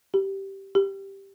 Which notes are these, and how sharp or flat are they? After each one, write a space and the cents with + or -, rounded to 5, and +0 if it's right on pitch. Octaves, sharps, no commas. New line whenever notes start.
G4 -10
G4 +0